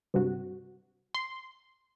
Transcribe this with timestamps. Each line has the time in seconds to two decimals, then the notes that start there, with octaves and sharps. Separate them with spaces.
0.14 G2 C3 F#4
1.14 C6